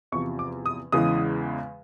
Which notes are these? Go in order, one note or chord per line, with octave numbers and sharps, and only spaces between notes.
E2 C3 F3 C#6
D6
D#6
E2 C#3 E3 G#3 D#6